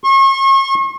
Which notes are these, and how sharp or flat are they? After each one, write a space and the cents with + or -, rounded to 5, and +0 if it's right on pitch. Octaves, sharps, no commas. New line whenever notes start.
C#6 -40